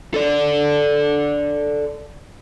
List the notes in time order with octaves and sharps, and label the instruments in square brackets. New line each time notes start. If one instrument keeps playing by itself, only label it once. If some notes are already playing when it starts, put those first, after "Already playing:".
[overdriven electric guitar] A4 D5